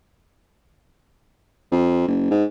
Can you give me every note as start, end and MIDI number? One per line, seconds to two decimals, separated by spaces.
1.71 2.03 41
2.08 2.27 30
2.31 2.44 44